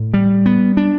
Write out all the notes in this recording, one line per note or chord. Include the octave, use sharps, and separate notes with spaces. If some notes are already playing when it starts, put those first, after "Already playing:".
Already playing: A2
G3
B3
D4